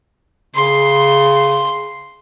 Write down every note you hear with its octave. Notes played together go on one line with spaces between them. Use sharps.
C#3 C6